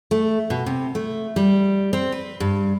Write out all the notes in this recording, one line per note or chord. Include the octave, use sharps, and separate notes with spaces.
A3
B2
C3
A3
G3
C4
B4
G2